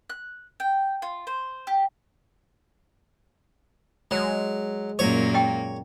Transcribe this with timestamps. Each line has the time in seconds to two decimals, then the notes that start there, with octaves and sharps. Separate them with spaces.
0.10 F#6
0.60 G5
1.02 F4
1.27 C5
1.67 G4
4.11 F#3 G#3
4.99 F#2 A#2 A#3 C#5
5.34 D#5 G5